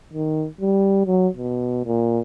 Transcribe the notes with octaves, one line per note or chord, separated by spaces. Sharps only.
D#3
G3
F#3
B2
A#2